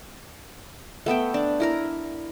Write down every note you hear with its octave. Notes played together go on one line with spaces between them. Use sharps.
A3 B3 E5 G5
D4
E4 A#4 A#5